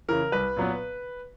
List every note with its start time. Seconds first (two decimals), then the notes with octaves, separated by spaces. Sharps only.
0.09 C#3 E3 A#4
0.32 C2 B4
0.57 A#2 F#3 B3